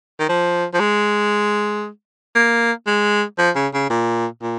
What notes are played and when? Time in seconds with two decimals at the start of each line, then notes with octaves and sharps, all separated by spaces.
0.20 D#3
0.29 F3
0.74 F3
0.80 G#3
2.36 A#3
2.87 G#3
3.38 F3
3.55 C#3
3.74 C#3
3.90 A#2
4.42 A#2